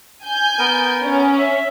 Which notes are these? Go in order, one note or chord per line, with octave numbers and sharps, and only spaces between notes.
G#5 G6
B3 A#4
C#4
E5